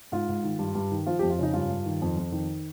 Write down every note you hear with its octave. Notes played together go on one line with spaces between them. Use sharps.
G#2 F4
G#2
D#3
G2
G2
D#3
F3 F4
G4
F2
F4
C#3 D#4
G2 F4
G2
D#3
F2
F2
D#3